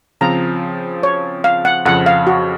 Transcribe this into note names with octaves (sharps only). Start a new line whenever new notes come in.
C#3 F3 C4 F4 A#5
C#5
F5
F#5
F2 C#3 F3 F#5
F5
F#4